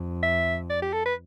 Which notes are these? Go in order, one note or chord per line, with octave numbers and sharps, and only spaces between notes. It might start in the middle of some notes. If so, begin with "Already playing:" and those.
Already playing: F2
E5
D5
G4
A4
B4